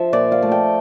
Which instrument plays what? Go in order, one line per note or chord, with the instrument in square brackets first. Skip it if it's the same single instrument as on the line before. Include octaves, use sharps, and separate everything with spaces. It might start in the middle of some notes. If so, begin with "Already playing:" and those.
Already playing: [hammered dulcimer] F3 C5 E5
A#2 D5
F5
A3
G5